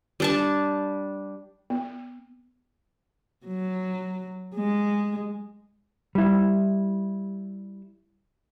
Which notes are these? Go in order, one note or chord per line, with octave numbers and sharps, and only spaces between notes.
G3 D4 A5
B3
F#3
G#3
G3 E4